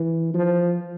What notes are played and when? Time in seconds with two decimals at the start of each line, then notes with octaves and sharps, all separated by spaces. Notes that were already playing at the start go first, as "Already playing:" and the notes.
Already playing: E3
0.34 F3